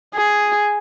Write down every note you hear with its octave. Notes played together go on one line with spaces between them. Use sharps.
G#4